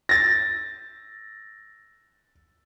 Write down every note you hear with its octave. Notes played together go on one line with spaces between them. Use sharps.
A6 A#6